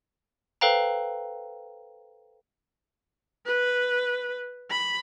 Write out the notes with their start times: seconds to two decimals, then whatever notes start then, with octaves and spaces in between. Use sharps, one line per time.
0.61 A4 B4 C5 F5 G5 A#5
3.46 B4
4.71 B5